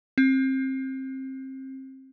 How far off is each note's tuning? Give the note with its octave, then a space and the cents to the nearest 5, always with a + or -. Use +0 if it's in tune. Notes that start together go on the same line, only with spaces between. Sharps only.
C4 +25